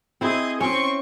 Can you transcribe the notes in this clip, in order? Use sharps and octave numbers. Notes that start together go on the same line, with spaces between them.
C4 E4 G#4 D#5
C4 C#4 C#6